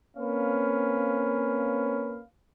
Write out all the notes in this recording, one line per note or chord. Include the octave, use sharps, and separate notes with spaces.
A#3 C4 C#4 B4 F5